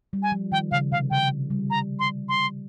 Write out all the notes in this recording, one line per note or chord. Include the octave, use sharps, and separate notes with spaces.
G3
G#5
F3
D#3 G5
C#3 F5
C3 F5
C#3 G5
G3
A#5
C6
C6